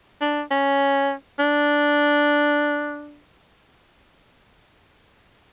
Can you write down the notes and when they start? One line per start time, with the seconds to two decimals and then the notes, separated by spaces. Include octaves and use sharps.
0.21 D4
0.51 C#4
1.39 D4